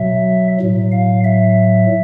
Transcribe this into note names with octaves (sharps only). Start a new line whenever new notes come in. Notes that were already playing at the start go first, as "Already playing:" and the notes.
Already playing: B2 F#3 E5
A2 F#3
F5
E5